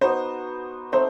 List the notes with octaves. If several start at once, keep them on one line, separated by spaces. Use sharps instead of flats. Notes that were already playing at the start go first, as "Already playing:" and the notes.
B3 D#4 F#4 C5
A3 C4 D#4 C5